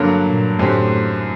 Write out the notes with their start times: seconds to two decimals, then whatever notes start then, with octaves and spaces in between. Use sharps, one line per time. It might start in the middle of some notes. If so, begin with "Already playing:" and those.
Already playing: G2 D3 F#3 A#3
0.26 A#2
0.59 F#2 A2 D3 F#3 C4 G4